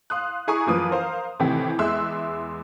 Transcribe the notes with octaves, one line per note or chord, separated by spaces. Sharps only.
F5 C6 D#6 F#6
E4 G#4 G#5 A#5 C#6 D#6
F#2 E3 F3 A#3 B4 D#6
A#4 C5 F5
A2 C3 D#3 E3 E4 G4
E2 G#3 E5 C6 E6 F#6